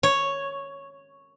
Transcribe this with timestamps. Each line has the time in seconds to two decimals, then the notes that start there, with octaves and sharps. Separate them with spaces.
0.03 C#5